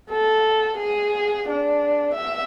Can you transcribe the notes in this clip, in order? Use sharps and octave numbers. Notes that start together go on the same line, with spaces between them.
A4
G#4
D4
E5